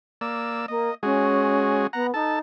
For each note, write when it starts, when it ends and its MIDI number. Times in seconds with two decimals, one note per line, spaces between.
0.21 0.66 58
0.21 0.66 74
0.21 0.66 88
0.68 0.89 58
0.68 0.95 75
1.03 1.87 56
1.03 1.85 61
1.03 1.87 66
1.03 1.87 68
1.93 2.10 59
1.93 2.07 78
1.93 2.07 82
2.14 2.40 63
2.14 2.39 69
2.14 2.39 81